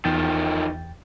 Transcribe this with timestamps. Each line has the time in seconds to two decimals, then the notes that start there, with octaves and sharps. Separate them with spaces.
0.05 E2 D#3 F3 G5 A6